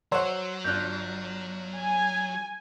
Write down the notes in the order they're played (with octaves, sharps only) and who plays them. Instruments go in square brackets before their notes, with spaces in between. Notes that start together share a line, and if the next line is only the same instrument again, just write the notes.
[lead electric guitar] F#3 [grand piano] C5 C#5 F#5 [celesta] E6
[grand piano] G1 D4 F4 [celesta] F#6 G6
[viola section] G#5